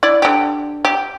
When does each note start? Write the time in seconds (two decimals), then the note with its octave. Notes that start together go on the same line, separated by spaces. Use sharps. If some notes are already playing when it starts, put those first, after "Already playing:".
0.03 E4 D5
0.22 D3 G4
0.85 G4